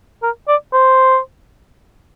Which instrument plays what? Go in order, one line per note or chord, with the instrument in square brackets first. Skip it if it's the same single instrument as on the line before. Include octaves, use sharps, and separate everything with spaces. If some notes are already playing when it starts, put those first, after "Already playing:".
[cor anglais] A#4
D5
C5